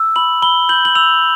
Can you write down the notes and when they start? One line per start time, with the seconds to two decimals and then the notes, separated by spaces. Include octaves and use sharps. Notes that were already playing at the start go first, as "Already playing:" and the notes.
Already playing: E6
0.16 B5 F#7
0.42 B5 G7
0.69 G6 F#7
0.85 F#7
0.95 E6 F7